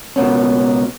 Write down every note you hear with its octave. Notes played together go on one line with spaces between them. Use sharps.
C#2 B2 A#3 B3 C#4